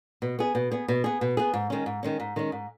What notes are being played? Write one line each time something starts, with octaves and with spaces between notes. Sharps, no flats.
B2
B3 G#4
B2
B3 G#4
B2
B3 G#4
B2
B3 G#4
G#2
D#3 G#3 C#4
G#2
D#3 G#3 C#4
G#2
D#3 G#3 C#4
G#2